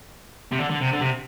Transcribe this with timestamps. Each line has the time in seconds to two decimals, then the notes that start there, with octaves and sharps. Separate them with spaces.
0.52 C3
0.58 D3
0.70 D3
0.81 C3
0.93 D3
1.01 C3